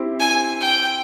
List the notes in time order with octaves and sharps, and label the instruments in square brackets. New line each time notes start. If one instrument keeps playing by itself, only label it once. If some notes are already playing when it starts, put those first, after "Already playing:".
Already playing: [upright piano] C4 E4 G4 C5
[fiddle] G#5
G5